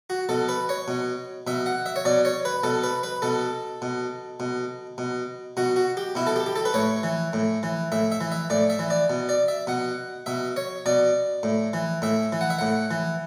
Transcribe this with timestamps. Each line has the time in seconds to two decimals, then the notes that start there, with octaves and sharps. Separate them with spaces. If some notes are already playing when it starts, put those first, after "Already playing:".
0.10 F#4
0.29 B2 A4
0.49 B4
0.69 C#5
0.88 B2
1.47 B2 E5
1.66 F#5
1.86 E5
1.96 C#5
2.05 B2 D5
2.25 C#5
2.45 B4
2.63 B2 A4
2.84 B4
3.03 B4
3.22 B2 A4
3.82 B2
4.40 B2
4.98 B2
5.57 B2 F#4
5.76 F#4
5.97 G4
6.15 B2 E4
6.27 A4
6.36 G4
6.46 G4
6.56 A4
6.65 B4
6.74 A2 C#5
7.03 E3
7.33 A2
7.63 E3
7.92 A2 E5
8.12 E5
8.21 E3
8.32 E5
8.50 A2 D5
8.70 E5
8.79 E3
8.90 D5
9.10 B2
9.29 D5
9.48 E5
9.67 B2 F#5
10.26 B2 E5
10.56 C#5
10.86 B2 D5
11.43 A2
11.73 E3
12.02 A2 E5
12.32 E3
12.41 F#5
12.50 E5
12.59 A2 F#5
12.91 E3